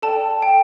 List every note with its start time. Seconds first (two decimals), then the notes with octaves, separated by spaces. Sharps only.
0.02 A4 D5 G5 A5
0.42 G5